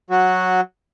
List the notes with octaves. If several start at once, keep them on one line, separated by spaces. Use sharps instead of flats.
F#3 F#4